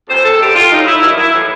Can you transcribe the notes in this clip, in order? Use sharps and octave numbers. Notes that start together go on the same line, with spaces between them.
F2 C3 E3 C5
A4
F#2 D3 F#3 G4
F4
A2 F#3 D#4
E4
G2 D#3 F#3 E4
E4
A2 E3